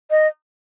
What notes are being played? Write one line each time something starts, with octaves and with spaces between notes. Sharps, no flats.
D#5